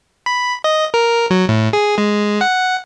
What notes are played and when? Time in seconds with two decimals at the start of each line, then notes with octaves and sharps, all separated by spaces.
0.26 B5
0.64 D#5
0.94 A#4
1.30 F#3
1.49 A2
1.73 G#4
1.98 G#3
2.41 F#5